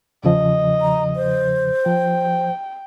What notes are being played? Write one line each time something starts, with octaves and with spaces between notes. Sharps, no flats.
E2 C#3 F3 D#5
A#5
C5
F3 G5